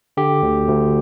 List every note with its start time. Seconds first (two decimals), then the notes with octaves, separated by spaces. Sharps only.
0.17 D3 G4
0.43 D2
0.69 D2